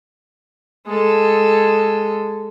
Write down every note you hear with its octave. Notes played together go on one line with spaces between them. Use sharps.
G#3 A4